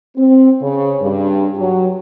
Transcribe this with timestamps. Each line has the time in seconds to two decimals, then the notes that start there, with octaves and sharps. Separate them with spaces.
0.17 C4
0.61 C#3
1.01 G2
1.57 F#3